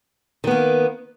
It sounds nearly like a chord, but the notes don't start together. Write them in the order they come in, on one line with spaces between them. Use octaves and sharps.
D#3 B3 A#3